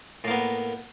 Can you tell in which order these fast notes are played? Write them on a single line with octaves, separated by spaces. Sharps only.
A2 A#3 B3